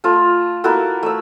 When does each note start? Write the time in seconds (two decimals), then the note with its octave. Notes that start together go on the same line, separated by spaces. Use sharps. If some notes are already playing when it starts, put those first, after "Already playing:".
0.04 A3 F4 A5
0.64 A#3 E4 F#4 A4
1.03 A3 E6